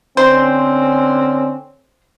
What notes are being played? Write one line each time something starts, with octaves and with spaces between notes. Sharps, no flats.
D3 C4 C#4 C5